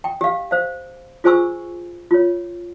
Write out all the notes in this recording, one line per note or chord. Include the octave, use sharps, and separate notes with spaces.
G5
G4 F5
C5 F5
F4 G#4 C5 G#5 C#6 E6
F4 C#5